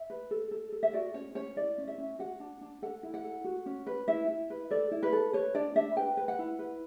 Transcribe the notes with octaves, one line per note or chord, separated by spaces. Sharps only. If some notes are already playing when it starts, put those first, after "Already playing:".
Already playing: E5
B4
A4
A4
A4
E5
F#4 D5
C#4 C#5
C#4 C#5
E4 D5
C#4
E5
C#4
F#4 F#5
D4
D4
A4 F#5
E4
F#5
A4
F#4
C#4
B4
E4 E5
E4
B4
A4 D5
E4
B4
A4
B4 C#5
D4 D5
D4 E5
B4 G5
B4
F#5
E4
B4